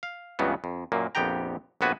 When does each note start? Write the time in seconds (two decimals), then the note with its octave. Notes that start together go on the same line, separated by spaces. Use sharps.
0.03 F5
0.39 C#2 G2 C#3 E3 B3
0.64 F2
0.92 F#2 A#2 A#3
1.15 A#1 F2 B3 G4 G5 A#5
1.81 A#1 C3 B3 F#4 B4 G#5